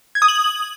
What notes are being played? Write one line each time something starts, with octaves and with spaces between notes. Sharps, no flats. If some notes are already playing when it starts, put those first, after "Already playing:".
G#6
D#6
F#7